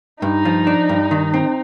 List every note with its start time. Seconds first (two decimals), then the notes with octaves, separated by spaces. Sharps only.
0.22 G2 D#4
0.45 F3
0.67 D4
0.89 G2
1.11 D#3
1.34 C4